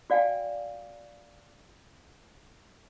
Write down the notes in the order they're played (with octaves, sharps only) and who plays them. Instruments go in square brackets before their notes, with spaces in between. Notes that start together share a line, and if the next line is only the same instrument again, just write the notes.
[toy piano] F#4 D5 F5 G5 G#5